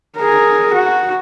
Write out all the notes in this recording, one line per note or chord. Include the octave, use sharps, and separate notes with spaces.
G#4 A#4
F#4